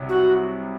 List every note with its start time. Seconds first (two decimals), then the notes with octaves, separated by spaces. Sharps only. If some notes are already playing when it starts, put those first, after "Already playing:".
Already playing: C2 C3 F#3
0.09 F#4